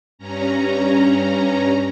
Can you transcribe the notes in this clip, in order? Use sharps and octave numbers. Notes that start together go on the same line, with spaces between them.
G2 C#4 A#5